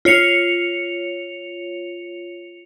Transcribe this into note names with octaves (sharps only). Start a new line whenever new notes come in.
F4 C#5 C#7 F7